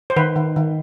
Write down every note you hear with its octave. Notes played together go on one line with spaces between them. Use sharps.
C5
D#3 B4
D#3
D#3